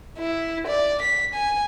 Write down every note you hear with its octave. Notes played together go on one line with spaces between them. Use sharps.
E4
D5
B6
G#5